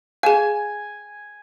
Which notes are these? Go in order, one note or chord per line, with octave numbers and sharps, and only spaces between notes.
G#4 F5 G#5